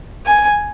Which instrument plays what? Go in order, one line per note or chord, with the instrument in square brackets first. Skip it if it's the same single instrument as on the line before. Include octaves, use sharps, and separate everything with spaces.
[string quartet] G#5